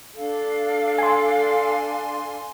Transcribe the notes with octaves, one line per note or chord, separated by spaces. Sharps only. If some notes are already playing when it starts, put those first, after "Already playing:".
D4 A4 F5
G#5 C6